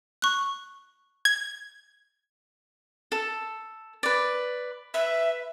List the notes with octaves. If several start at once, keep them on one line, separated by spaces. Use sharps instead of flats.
C#6 F#6
G#6
A4
B4 D5
B4 E5